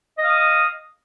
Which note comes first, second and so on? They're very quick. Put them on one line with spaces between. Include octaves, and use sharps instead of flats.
D#5 F5 D#6